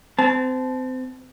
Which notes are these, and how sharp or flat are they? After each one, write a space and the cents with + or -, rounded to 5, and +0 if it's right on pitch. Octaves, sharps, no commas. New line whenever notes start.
C4 -30 A5 -20